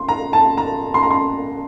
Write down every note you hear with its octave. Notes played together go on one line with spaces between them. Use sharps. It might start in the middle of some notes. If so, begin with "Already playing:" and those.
Already playing: C6
A#5
A5
A#5
C6
A#5
C6